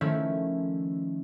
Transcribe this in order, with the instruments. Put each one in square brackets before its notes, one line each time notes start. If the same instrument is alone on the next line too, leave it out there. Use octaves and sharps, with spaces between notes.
[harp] D#3 F3 A3 C#4 E4